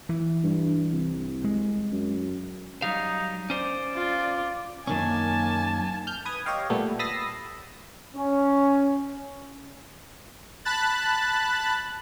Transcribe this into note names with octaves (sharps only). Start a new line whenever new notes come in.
E3
G2
C2
G#3
F#2
F#3 G3 D#4 F5
C#4 C5 D5
F4
F#2 D#3 A#3 C#4 G#5 A5
F6 G6
B4 D#6 G#6
G4 C#5 D#5 F5 G5
A#2 G3 A3 B3
B5 D#6 E6 A6 A#6 C7
C#4
A5 B5 F#6 A6